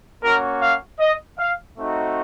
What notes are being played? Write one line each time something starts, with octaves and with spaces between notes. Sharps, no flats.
A#3 C#4 F#4 A#4
F5
D#5
F5
A3 C4 D#4 F#4